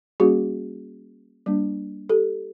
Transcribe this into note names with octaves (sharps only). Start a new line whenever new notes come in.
G3 A#3 C#4 F#4 G#4
G3 A#3 D4
G4 A4